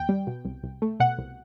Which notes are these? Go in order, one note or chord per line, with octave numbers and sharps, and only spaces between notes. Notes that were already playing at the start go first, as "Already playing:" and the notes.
Already playing: D#2 G5
G3
B2
C2
C2
A3
B2 F#5
C2